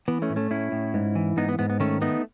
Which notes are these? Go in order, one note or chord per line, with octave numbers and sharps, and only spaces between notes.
E3 B3
A3 C#4
A2
A3 C#4
A2 C#4 E4
A2
G#2
E3
G#2 B3 D#4
B3
G#2 B3
B3
D#3 A3 C#4
A3 B3 D#4